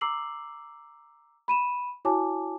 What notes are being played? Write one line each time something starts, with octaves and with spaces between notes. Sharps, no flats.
A#5 D6 E6 C7 F#7
B5 D#7 E7
E4 F#4 C#5 G#5 A5 D6